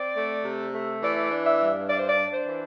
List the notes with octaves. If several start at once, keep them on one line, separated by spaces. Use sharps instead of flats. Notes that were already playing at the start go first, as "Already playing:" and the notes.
Already playing: C4 D5
A3
C3
A3
E3 D5
D4
E5
G2
D4 D5
C5
D5
D4
C5
E3